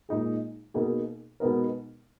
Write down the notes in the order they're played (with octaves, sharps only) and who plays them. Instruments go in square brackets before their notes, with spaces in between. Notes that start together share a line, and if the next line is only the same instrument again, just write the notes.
[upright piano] A#2 G#3 D#4 G#4
B2 A#3 D#4 G#4
B2 G#3 B3 D#4 A#4